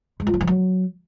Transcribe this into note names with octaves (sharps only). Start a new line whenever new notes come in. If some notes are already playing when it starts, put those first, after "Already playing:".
G#3
F4
F#3
E3
F#3